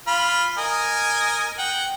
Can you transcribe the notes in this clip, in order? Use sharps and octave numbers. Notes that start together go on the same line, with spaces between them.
F4 B5 F6
A#4 D#5 G#5
F#5 G5